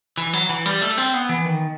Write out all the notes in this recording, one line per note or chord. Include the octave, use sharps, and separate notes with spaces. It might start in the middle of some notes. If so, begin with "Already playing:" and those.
E3
F#3
E3
G3
A3
C4
B3
E3
D#3